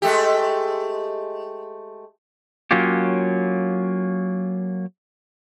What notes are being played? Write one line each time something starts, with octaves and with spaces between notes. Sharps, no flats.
G#3 A3 G4
F#3 A#3 C#4 F4 G4